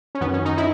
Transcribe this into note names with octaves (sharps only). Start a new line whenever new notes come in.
C#4
F#2 D#3 B3
C#4
D#4
E4